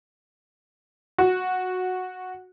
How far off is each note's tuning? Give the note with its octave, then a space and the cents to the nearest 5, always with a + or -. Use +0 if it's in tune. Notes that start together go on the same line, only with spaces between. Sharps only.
F#4 -10